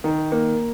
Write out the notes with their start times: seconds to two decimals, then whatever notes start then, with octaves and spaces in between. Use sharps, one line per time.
0.04 D#3
0.32 A#3